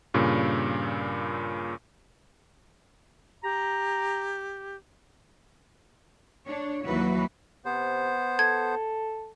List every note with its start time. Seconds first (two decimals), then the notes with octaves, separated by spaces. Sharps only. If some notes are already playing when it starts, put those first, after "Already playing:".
0.14 G2 A#2 C#3
3.43 G4 A#5
6.46 D4 C#5
6.86 D#2 E3 F#3 F#4 B4
7.65 C3 B3 C5
8.39 A4 G#6